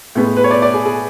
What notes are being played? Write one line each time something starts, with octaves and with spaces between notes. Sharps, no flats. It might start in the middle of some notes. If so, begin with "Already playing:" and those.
A2 G#3 B3
B4
C#5
D5
D5
G#4
G#4